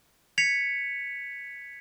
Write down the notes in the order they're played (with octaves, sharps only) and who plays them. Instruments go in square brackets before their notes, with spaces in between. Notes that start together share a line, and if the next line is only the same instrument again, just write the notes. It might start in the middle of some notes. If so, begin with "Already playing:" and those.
[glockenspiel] G#6 B6 C#7 F7